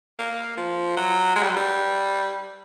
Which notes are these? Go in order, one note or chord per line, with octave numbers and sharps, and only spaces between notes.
A#3
F3
F#3
G#3
G3
F#3
G3